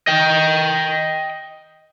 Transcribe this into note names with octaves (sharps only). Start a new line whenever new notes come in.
D#5 G5